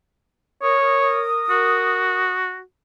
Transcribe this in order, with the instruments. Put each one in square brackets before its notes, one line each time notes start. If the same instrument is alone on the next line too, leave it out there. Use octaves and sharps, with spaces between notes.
[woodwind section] A#4 D#6 [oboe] C#5
[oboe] F#4